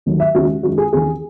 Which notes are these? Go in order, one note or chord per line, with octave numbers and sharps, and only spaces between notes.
D#2 D#3 F#3 A3
E5
D#2 C#3 G#3 F#4
F#2 D#3 G#3 F#4
G#4
D#2 C#3 E3 G#4